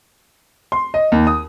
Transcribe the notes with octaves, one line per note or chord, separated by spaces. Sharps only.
C6
D#5
D#2
D#6